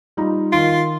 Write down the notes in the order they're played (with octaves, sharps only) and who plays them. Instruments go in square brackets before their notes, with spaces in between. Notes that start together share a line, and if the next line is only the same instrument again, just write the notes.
[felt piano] G3 D#4 F4
[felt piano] D#3 D7 [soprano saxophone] F4